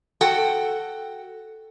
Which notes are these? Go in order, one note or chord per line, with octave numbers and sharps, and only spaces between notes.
F#4 A4 F#5 G5